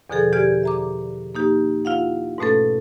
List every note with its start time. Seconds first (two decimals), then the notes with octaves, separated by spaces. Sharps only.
0.10 E2 B2 D3 F3 G#4 A4
0.32 E2 G4 D5 F6 G#6
0.63 E5 A#5 D6
1.35 A#3 D#4 G4
1.85 E4 F4 F5 F#5
2.38 G#2 B2 A3 C#4 A4